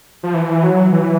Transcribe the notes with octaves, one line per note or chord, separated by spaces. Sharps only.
F3
E3
F#3
E3